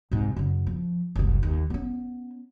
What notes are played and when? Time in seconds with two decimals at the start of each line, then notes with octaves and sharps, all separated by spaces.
0.11 C2 G#2
0.36 F#2 C#3
0.67 F3
1.16 F#1 C2
1.43 D#2
1.70 B3 C#4